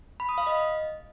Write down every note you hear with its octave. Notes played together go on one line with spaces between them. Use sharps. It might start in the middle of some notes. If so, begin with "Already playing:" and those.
B5
D#6
F5
D#5